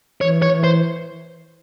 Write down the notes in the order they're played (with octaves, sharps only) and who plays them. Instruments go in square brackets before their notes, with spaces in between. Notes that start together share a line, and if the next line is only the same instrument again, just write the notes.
[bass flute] E3 [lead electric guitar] C#5
[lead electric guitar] C#5
[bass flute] E3
[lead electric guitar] C5